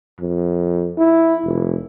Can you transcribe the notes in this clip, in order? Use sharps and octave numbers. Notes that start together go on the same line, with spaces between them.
F2
E4
F1